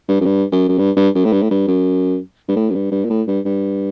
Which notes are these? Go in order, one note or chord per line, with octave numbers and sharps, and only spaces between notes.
G2
F#2
G2
F#2
F#2
G2
G2
F#2
A2
G2
A2
G2
F#2
G2
A2
F#2
G2
G2
A#2
A2
G2
G2